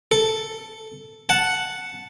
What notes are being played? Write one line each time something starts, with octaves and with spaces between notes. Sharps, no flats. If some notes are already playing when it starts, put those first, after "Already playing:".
A4
F#5 A5